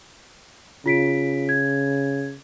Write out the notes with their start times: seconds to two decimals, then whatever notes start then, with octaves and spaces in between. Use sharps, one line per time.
0.86 C#3 F4 B6 D7
1.49 G#6